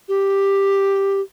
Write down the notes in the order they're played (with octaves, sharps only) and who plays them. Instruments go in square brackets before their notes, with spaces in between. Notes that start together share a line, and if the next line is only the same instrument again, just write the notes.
[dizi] G4